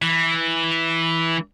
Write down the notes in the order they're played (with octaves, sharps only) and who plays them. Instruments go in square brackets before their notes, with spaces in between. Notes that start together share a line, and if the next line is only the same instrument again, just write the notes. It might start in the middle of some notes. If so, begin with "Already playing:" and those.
[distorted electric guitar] E3